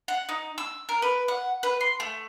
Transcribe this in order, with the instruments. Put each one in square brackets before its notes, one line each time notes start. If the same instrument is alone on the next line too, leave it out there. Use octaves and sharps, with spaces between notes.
[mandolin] F#5
D#4
E6
A#4
B4
F#5
B4
C6
A3